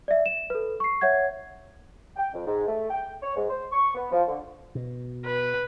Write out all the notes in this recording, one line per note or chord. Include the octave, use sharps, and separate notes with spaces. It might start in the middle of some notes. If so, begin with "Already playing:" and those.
D5 E5
E7
A4 B4
C#6 C7
C#5 E5 F#5 G#6
G5
F2
G#2
A3
G5
C#5
G#2
C5
C#6
B3
F3
D3
B2
B4